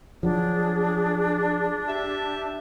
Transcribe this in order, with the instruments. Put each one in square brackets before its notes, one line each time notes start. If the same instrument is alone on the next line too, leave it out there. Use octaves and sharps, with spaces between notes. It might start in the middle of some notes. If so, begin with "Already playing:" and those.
[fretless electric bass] F3 F#3 [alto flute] D4 [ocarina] G#4
[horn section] G4 E5 A5